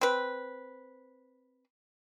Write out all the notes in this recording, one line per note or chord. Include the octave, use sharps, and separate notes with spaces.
C4 B4